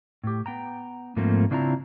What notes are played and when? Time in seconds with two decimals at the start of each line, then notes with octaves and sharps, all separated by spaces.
0.24 A2 G4
0.46 B3 G5 A#5
1.16 G#2 F3 A3 A#3 C4
1.51 C#3 C4 D4 E4 F4 A#5